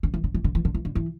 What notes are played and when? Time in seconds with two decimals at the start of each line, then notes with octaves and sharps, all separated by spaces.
0.03 D3
0.14 E3
0.24 D3
0.34 E3
0.44 D3
0.55 E3
0.65 D3
0.75 E3
0.85 D3
0.95 E3